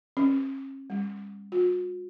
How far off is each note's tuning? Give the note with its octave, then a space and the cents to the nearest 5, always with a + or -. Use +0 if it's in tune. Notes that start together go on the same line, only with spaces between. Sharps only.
C#4 -40
G3 +45
F#4 -45